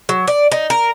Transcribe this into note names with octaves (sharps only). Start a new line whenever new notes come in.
F#3
D5
D#4
A#4